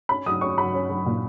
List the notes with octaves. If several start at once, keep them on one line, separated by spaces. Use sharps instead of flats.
C#4 B5
F#3 D#6
C#4 C#6
F#3 B5
C#4
F#3
A#2